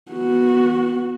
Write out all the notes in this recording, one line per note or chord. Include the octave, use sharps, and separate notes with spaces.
B3 F#4